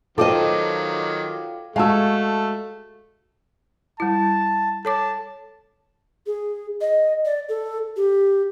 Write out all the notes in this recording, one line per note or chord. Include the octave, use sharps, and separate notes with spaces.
D#3 F#3 F4 A4 C5 D#5 G5 D6
G#3 A3 F#4 F5 A5 E6
G3 E4 A5
A4 C#5 A5 D6
G#4
D#5
D5
A4
G4